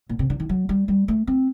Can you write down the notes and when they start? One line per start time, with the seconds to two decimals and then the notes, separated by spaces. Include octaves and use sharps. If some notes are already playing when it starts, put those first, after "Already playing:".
0.09 A#2
0.19 C3
0.30 D3
0.40 D#3
0.49 F#3
0.69 G3
0.88 G3
1.08 A3
1.27 C4